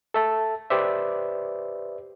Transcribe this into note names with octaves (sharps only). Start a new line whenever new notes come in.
A4 E5 A5
G4 B4 C5 D5 E5